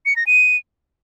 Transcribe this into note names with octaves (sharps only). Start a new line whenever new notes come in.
C#7
A#6
D#7